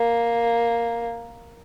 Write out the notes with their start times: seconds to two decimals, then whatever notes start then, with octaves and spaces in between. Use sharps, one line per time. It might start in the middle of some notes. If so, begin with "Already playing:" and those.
Already playing: A#3